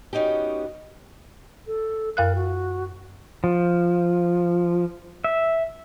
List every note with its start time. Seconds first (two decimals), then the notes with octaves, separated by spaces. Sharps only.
0.13 B3 C#4 D#4 F#4 G4
1.67 A4
2.17 F#2 A#4 F5 F#6
2.35 F#4
3.44 F3
5.24 E5